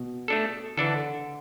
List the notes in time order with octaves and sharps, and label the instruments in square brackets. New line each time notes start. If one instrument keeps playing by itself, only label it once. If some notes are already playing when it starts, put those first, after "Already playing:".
Already playing: [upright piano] B2
[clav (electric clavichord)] A3 D4 A4
[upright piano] D3 [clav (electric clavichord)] E3 D4 A4